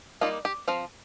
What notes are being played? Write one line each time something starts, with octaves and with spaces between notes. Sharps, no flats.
G3 A#3 D#4 F4
G4
F3 C4 F5